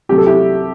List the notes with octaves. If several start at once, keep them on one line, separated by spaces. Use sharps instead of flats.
C2 C3 F#3 A3 G4
A4
E4 G4